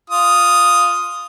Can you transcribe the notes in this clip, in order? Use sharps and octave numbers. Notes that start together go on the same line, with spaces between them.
F4 D#6